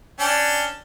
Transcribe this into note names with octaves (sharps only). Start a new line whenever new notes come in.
C#4 D4 G5